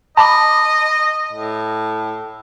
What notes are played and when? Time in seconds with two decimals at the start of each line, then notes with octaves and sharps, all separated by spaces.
0.17 D#5 A5 B5 D6
1.32 A2